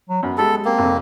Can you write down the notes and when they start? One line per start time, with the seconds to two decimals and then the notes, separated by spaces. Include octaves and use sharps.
0.09 F#3
0.23 F#2 B3
0.38 G#3 G4 A4
0.65 A#3 C4
0.78 F1 F2